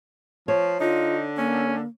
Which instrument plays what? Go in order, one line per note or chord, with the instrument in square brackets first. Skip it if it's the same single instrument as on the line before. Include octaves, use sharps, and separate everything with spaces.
[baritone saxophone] F3 [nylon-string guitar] C#5
[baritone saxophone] D3 [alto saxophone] D#4 [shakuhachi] F4
[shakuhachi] A#3 [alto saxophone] C#4